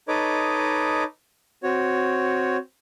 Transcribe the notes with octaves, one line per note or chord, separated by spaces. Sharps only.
D#4 A4 B4 C#5 D#5 D6
C4 F#4 C#5